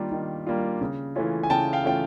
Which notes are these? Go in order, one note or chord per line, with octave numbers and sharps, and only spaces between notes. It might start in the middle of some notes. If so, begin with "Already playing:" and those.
Already playing: D#3 G3 A#3 D4 F4
D#3
G3 A#3 D4 F4
C#3
E3 A3 C#4 F4
G#5
C#3 G5 A5
F5 G5
E3 A3 C#4 F4 G5